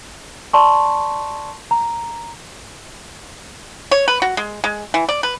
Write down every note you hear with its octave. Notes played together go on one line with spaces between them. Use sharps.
D5 A5 C6 C#6
A#5
C#5
B4
F#4
G#3
G#3
E3
D5
B4